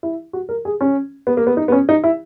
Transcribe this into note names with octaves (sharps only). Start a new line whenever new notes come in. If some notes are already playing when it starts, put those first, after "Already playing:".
E4
F#4
A#4
G#4
C#4
B3
A#3
B3
D#4
B3
C#4
D#4
E4